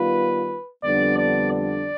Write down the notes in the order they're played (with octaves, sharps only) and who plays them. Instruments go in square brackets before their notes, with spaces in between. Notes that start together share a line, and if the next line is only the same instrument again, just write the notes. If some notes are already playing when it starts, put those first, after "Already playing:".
Already playing: [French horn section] D#3 G3 B3 F4 [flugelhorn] B4
[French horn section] F2 D3 G3 B3 D4 [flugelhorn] D5
[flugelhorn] D5
D5